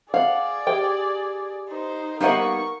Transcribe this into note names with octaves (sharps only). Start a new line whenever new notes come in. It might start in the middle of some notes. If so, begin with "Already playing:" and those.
G#4 D5 F5 F#5
G4 G5
D#4 C5
G3 A#3 B3 D#4 A#4 F#5 C#6